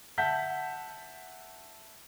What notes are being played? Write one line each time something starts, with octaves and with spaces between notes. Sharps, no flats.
E5 F#5 A5 G6 B6